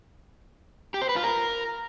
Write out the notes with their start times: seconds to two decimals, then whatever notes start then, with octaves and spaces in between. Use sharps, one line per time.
0.94 G4
1.02 C5
1.09 B4
1.16 F4
1.24 A#4